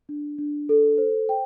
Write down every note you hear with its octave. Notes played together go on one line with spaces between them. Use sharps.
D4
D4
A4
C5
G5